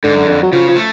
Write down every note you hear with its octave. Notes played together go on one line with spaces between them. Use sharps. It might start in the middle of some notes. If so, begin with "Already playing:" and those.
G#2 D3
F#2
F2 D3
F#3
C#3 F3
F3
A3